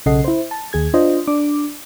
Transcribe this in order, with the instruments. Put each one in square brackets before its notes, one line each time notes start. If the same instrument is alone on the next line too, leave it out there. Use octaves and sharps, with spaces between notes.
[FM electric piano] B1 C#3 A4 D#5 F#5 C7
E4 C5
A5
D#2 G#4 G#6
D4 F4 C5 D#5
D4 D6